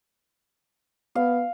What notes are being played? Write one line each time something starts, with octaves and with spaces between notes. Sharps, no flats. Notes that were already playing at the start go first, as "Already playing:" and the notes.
B3 F5